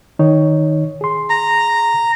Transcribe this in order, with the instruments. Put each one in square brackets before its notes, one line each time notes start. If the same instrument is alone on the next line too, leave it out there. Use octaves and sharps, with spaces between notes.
[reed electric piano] D#3 D#4 C#5
G#4 C6
[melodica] A#5